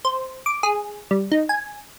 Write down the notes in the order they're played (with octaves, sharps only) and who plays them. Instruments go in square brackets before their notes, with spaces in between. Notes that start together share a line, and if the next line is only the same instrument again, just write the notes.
[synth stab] C5
D6
G#4
G3
D#4
G#5